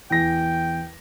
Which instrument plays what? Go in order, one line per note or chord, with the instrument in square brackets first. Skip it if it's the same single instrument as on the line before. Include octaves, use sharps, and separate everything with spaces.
[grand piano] E2 A#6 [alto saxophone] G5